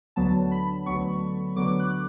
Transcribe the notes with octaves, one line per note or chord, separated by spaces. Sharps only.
D2 D3 F#3 B3 A5
B5
D2 D3 F#3 B3 C#6
D2 D3 F#3 B3 D6
F#6